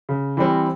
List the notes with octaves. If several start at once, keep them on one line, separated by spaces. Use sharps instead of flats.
C#3
E3 G3 C4